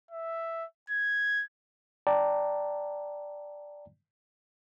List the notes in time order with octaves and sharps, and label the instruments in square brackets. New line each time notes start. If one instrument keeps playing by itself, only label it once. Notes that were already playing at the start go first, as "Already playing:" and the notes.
[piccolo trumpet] E5
G#6
[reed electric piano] D5 G5 A5 A#5